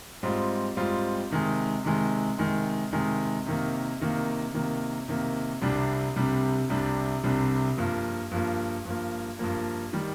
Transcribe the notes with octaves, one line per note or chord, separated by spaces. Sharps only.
G#2 G3 C4 F4
G#2 G3 C4 F4
C3 D#3 G#3
C3 D#3 G#3
C3 D#3 G#3
C3 D#3 G#3
C3 D#3 A#3
C3 D#3 A#3
C3 D#3 A#3
C3 D#3 A#3
C2 C3 G3 D4
C2 C3 G3 D4
C2 C3 G3 D4
C2 C3 G3 D4
G2 F3 A#3
G2 F3 A#3
G2 F3 A#3
G2 F3 A#3
D#3 G3